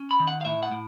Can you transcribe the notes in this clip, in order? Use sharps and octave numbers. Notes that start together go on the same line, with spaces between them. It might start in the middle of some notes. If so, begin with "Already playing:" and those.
Already playing: C#4
B5
D#3
F#5
F5
A2 E5
F#5
A2